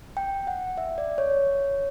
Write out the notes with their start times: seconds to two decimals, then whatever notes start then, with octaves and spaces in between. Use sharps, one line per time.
0.17 G5
0.47 F#5
0.77 E5
0.98 D5
1.18 C#5